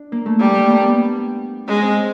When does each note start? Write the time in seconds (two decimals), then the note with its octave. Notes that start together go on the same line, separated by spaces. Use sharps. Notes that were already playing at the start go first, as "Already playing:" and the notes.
Already playing: D4
0.12 A#3
0.26 A3
0.40 G3 A#3
0.58 A3
0.70 A#3
0.83 B3
1.67 G#3 C#4
1.82 C4